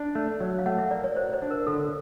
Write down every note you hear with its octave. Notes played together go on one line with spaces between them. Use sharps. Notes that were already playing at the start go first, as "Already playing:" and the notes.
Already playing: D4
A3
F#3
F5
A3 F#5
E5
A#4 D5
C#5
F#4 C5
C5
D4
A#4
D3 A4